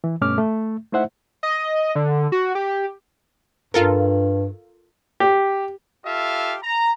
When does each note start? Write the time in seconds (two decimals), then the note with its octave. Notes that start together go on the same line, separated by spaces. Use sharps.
0.04 E3
0.21 G2 B2 A3 C#4 D6 F6
0.38 A3
0.93 A3 D#4 E4 C5 E5 F#5
1.43 D#5
1.95 D3
2.32 F#4
2.55 G4
3.74 G2 F4 A4 A#4
5.20 G4
6.06 F4 G4 A4 E5 F5
6.63 A#5